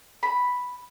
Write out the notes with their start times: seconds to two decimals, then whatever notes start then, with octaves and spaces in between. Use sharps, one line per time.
0.23 B5